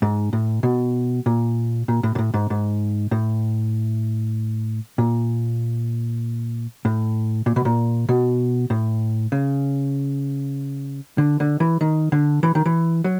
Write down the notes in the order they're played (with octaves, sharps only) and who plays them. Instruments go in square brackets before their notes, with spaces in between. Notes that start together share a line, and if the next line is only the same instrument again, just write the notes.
[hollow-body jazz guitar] G#2
A2
B2
A#2
A#2
A2
G#2
A2
G#2
G#2
A2
A#2
A2
A#2
B2
A#2
B2
A2
C#3
D3
D3
E3
D#3
D3
E3
D#3
E3
F#3